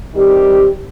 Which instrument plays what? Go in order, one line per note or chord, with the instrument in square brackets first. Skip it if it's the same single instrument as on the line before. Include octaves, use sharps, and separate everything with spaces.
[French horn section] D#3 G3 C4 G4